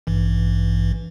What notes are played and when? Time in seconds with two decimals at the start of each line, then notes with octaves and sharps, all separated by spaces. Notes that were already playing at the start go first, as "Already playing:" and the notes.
0.07 A1 G2 E3